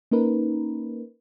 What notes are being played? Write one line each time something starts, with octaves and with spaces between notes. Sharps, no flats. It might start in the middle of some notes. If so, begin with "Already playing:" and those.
A#3 C#4 D#4 A#4 B4